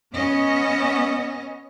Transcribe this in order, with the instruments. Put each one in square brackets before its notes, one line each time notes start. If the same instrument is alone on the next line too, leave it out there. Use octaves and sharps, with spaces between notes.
[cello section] B3 C#4 D#5